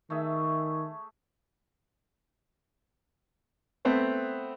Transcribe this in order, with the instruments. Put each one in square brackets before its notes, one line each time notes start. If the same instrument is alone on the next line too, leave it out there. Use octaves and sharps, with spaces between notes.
[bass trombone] D#3 [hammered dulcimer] A3 G#4 E5
[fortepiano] A3 B3 C4